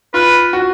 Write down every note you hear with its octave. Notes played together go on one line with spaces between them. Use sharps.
F4 B4
F#4